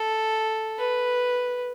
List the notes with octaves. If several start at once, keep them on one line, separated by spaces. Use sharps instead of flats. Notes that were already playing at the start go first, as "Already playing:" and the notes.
Already playing: A4
B4